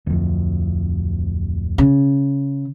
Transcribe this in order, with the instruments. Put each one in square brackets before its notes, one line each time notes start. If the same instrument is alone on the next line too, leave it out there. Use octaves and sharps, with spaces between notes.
[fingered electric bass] D1 F2
[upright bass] C#3